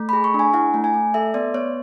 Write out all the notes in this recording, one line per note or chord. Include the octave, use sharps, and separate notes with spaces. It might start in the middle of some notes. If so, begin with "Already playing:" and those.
Already playing: A3
G#4 B5
C#6
D4
G#5
E4 F#5
A3
G#5
A3
A4 E5
B3 D5
B3 C#5